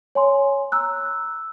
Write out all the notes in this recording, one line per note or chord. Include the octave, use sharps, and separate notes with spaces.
C#5 G#5 C6
A#5 E6 F#6